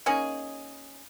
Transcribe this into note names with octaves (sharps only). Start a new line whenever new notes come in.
A#3 C#4 D#4 G#4